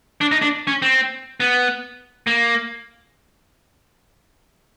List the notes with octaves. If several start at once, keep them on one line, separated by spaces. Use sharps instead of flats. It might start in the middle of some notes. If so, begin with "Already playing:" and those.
D4
D#4
D4
C#4
C4
B3
A#3